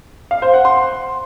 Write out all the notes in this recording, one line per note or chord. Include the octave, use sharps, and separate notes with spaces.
F5
C5
F#5
C6